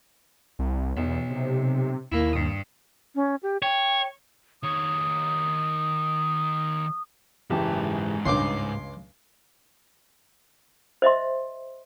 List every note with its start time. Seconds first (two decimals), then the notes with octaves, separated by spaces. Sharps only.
0.59 C2
0.97 B1 E2
1.30 C3
2.12 D#2 A#3 E4
2.33 G2 D#6
3.15 C#4
3.43 G4
3.62 C#5 G5
4.63 D#3 C#5 D#6
7.50 F#1 G#2 E3 G4 A5
8.25 C#2 G2 C#5 C6 D6
11.02 C5 D#5 E5 C6